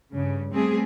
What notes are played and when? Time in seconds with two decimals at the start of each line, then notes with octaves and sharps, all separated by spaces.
0.12 G2 C#3
0.52 G3 A3 B3 C4 G#4